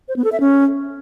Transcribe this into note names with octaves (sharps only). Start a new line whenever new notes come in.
C5
B3
A4
E5
C#4